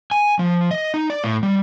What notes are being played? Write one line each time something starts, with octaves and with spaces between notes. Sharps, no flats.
G#5
F3
D#5
D#4
D5
A2
G3